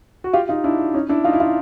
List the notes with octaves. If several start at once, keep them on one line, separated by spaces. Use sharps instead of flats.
F#4
F4 G4
D#4 F4
D4 E4
C#4 D#4
D4 E4
D#4 F4
E4
D#4 F4